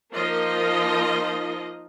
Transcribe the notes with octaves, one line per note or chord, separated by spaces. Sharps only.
F3 A#3 D#4 F4 A#4 D#5